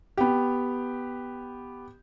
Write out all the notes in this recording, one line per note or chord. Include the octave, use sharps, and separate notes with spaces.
B3 G4